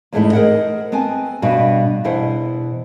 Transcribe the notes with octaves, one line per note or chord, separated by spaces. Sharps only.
E2 G#2 G#3 A3 D#4 E4
G#4 A#4 C5 D#5 F#5
B3 C4 G#5 A5
G2 B2 F#4
E2 B2 E4 C5 F#5